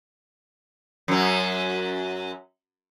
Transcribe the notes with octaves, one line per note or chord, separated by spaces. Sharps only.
F#2 F#3